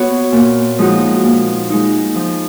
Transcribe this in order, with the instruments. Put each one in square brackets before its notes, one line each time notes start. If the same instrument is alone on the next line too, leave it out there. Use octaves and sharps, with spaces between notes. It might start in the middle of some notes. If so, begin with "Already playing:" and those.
Already playing: [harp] B3 F#4 C#5
A#2
F3 G#3 D#4 F#4
A#2
G#3 D#4
F3